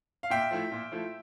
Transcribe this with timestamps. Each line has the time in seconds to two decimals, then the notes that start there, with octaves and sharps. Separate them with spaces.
0.23 F5
0.30 A#2 E5 G5
0.51 F3 A3 E4
0.72 A#2
0.92 F3 A3 E4